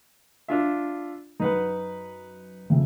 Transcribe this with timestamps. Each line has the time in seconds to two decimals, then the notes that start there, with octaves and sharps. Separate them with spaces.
0.48 D4 F4 E5
1.40 F#2 D#4 B4 F#5
2.70 F2 C#3 E5